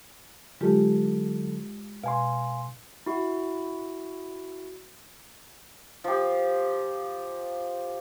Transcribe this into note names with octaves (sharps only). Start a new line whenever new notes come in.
D3 F#3 G#3 F4 G4 A4
B2 F5 G#5 C6
E4 F#4
F3 G4